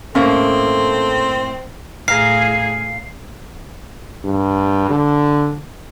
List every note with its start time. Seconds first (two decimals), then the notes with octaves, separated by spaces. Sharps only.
0.15 A2 A#3 C4 C#4 A4
2.08 A2 G#4 F5 A#5 C7
4.24 G2
4.89 D3